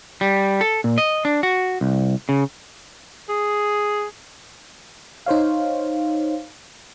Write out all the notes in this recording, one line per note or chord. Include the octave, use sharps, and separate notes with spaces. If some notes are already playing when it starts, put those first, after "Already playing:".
G3
A4
A#2
D#5
D4
F#4
C2
C#3
G#4
D#4 C5 C#5 F5